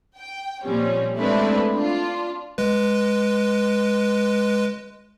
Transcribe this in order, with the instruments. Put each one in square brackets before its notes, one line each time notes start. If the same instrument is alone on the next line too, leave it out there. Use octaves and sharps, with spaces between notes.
[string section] G5
A#2 F3 G3 C4 C#4
G#3 A3 C4 D4 E4 B4
D4 F4
[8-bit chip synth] G#3 B4